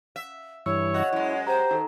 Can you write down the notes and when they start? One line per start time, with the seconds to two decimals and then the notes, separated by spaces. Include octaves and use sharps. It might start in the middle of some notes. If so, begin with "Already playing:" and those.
0.16 E5
0.66 G2 E3 C#5 C#6 E6
0.94 C#3 F#4 D#5
1.13 F#2 G#3 E4
1.47 G4 C5 A#5
1.71 D#3 D#4 A4